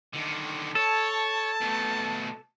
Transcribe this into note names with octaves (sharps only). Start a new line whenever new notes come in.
D3 D#3
A4 C#5 A5
B2 A3